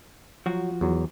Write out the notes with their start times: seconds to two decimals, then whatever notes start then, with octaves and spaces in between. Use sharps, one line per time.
0.46 F3 F#3 F#4
0.81 E2 F#3